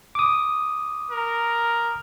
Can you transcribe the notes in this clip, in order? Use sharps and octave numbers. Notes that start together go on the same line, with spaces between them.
D6 D#6
A#4